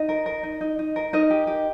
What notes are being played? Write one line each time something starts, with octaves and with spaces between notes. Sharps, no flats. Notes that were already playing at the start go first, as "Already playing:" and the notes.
Already playing: D#4 D#5
A#4
A#4
D#4
D#4
D#4
A#4
D#4 A#4 D#5
G4
G4